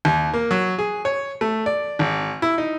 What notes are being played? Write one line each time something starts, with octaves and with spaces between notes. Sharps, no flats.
D#2
A#3
F#3
G#4
C#5
A3
D5
G#1
E4
D#4